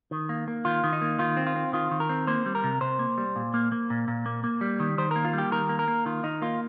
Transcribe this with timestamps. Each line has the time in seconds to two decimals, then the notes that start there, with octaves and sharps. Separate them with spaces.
0.11 D#3
0.29 A#3
0.48 A#3
0.65 D#3 F4
0.84 D#3
0.93 D#4
1.01 A#3
1.19 D#3 F4
1.37 C4
1.47 F4
1.56 C4
1.73 D#3 F4
1.91 D#3
2.00 A#4
2.09 C4
2.27 A#3 C5
2.46 G3
2.55 A#4
2.64 C3
2.81 C3 C5
2.99 A#3
3.18 G3
3.36 A#2
3.54 A#3
3.72 A#3
3.90 A#2
4.08 A#2
4.26 A#3
4.44 A#3
4.61 G3
4.80 D#3
4.98 D#3 C5
5.11 A#3 A#4
5.25 F4
5.33 G3 G4
5.52 D#3 A#4
5.69 A#3
5.79 A#4
5.88 A#3
6.06 D#3 F4
6.23 D#3 D#4
6.42 A#3 F4